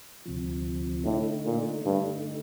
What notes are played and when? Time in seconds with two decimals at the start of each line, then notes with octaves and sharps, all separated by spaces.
0.26 D2 C3 F3
1.05 A2 D3 A3 D#4
1.45 A#2
1.85 G2 D3 A3 D#4